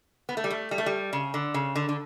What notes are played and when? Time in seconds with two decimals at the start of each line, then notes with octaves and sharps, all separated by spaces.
0.29 B3
0.37 A3
0.44 G3
0.50 A3
0.71 G3
0.78 A3
0.86 G3
1.13 C#3
1.34 D3
1.54 C#3
1.75 D3
1.89 D3